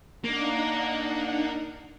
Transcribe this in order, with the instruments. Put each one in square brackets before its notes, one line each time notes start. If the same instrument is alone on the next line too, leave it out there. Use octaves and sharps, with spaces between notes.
[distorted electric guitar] A#3 [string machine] D4 D#4 F#5